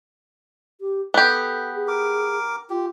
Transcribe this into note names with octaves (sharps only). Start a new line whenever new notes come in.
G4
B3 G4 A4
G#4
A#4 D6
F4 G4